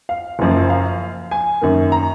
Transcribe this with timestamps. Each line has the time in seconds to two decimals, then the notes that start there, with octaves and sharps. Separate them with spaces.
0.09 F5
0.39 F#1 F#2 F3
0.70 F5
1.31 G#5
1.61 F#2 D#3 A#3
1.92 A#5